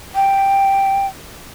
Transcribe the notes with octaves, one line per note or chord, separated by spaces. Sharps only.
G5